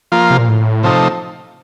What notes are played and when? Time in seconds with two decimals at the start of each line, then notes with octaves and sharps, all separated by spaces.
0.12 F3 A#3 F4
0.31 C3
0.39 A#2
0.48 A2
0.83 C3 F3 A3 D#4